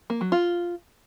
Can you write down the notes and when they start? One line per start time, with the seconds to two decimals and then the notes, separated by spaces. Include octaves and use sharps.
0.10 A#3
0.21 F#3
0.32 F4